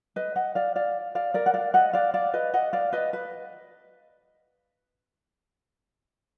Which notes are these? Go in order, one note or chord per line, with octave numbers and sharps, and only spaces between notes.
B4 D#5
D#5 F#5
D5 F5
D5 F5
D5 F5
A#4 D5
F#5
D5 F5
D#5 F#5
D5 F5
D5 F5
B4 D#5
D#5 F#5
D5 F5
B4 D#5
B4